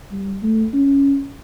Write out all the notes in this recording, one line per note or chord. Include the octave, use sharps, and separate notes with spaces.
G3
A3
C#4